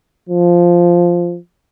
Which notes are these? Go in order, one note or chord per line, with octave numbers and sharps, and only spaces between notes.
F3